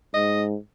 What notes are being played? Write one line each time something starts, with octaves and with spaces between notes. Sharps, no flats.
G#2 D#5